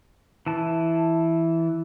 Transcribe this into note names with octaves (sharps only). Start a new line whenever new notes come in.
E3 A5